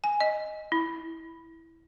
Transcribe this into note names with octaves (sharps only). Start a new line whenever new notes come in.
G#5
D#5
E4